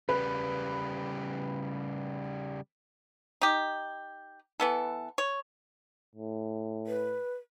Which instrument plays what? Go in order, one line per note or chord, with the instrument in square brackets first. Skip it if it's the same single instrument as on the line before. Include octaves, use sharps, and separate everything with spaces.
[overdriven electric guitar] C#3 G3 [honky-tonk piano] B4
[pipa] D#4 G4
E3 B3 A4
C#5
[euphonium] A2
[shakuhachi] B4